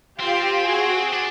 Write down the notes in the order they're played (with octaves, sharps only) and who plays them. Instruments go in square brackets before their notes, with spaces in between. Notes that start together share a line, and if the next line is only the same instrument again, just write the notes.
[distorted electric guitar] C4 [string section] F4 G4
[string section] F#4 G#4
[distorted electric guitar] D4